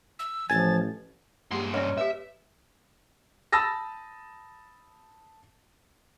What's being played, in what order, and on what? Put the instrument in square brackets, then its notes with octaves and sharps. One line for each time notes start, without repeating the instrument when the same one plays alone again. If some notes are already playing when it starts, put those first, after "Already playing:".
[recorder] E6
[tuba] A1 [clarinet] F3 [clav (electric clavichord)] G#5 [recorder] A6
[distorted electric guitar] G2 C6 [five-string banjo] G#3 [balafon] A#3 G4
[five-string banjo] C#4 [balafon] D5 D#5
[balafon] G4 B4 [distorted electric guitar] E5
[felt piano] A5 B5 D#6 E6 A6 A#6